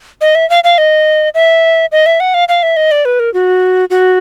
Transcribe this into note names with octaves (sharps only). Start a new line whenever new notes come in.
D#5
E5
F5
F5
D#5
E5
D#5
E5
F#5
F5
F5
E5
D#5
D5
B4
A#4
F#4
F#4